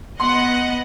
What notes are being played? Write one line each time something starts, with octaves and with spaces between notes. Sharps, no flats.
B3 D#5 F#5 C6